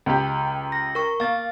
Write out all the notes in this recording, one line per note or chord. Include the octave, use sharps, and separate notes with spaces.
C#2 G4
A#6
A#4 C#6
A#3 F5 A6